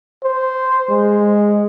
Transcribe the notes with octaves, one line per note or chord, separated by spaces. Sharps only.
C5
G#3